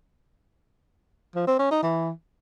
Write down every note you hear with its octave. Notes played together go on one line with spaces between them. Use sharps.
F3
C4
C#4
D#4
E3